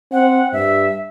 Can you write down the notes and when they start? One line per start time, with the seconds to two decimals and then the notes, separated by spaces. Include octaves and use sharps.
0.12 C4 F#5
0.53 G2 E5